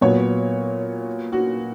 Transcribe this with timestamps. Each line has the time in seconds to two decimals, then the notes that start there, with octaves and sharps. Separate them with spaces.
0.01 A#2 F#3 B3 C#5
1.33 F#4